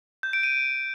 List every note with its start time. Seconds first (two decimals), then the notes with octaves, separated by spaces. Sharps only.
0.23 G6
0.33 D7
0.43 D#7